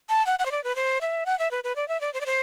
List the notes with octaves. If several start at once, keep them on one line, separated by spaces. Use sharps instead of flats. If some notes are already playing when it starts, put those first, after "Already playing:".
A5
F#5
F#5
C5
D5
B4
C5
E5
F#5
E5
B4
B4
D5
E5
D5
C5
D5
C5